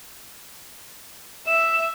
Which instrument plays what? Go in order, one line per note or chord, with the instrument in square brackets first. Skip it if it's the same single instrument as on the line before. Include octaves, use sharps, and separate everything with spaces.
[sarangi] E5 [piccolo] E7